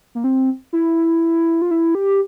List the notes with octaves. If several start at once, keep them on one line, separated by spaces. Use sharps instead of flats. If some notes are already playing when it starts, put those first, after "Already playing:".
A#3
C4
E4
F4
E4
G4